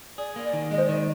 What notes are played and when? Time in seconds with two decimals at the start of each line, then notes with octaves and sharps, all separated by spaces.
0.18 G#4 D5
0.36 A#3
0.44 D5
0.53 D#3
0.71 G#3 D#5
0.78 C5
0.84 D5
0.89 D#3 D#5
0.97 D5